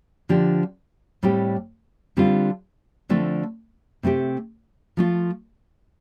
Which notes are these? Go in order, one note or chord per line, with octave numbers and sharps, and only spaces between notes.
D3 F3 D4 G4
A2 G3 C4 G4
D3 G3 C4 F4
D3 F3 A3 C4
C3 A3 C4 G4
F3 A3 F4